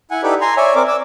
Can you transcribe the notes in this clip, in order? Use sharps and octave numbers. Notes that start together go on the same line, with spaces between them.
E4 F#5 G#5
D#4 E4 G4 A4 B4 D5
G#5 A#5 C6
C#5 D5 E5 G#5
C4 A#4 D5 D6
D5 D6 E6